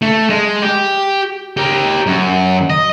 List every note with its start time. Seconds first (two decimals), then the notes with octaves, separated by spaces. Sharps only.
0.02 A3
0.30 G#3
0.62 G4
1.57 G4 A#4
2.06 F#2
2.70 D#5